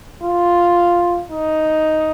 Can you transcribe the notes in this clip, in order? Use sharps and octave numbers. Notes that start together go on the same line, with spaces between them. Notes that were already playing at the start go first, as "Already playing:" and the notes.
F4
D#4